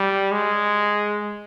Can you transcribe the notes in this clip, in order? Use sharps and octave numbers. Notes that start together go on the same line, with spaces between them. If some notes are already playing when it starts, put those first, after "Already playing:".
Already playing: G3
G#3